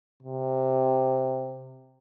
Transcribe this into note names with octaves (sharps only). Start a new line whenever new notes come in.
C3